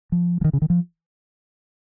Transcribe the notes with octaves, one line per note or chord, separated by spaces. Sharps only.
F3
F3
D#3
C#3
D#3
F3